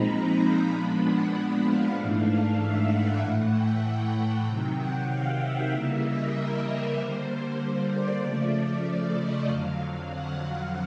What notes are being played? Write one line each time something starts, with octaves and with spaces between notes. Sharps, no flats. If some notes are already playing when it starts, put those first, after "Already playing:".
Already playing: A#2 F3 G#3 C4 D#4 A#5 B5
A#2 F3 G#3 B3 D4 B5
F#5
F5
G#2 E3 A3 D4
F5
E5
F#5
A2 E3 A3
G5
C3 D#3 F#3
F#5
F5
E5
C#3 E3 G3 A#3
D#5
A#4
D3 G3 A#3 C5
D5
C#3 F3 A3
D#5
F2 D3 F#3 F5
F#5
F5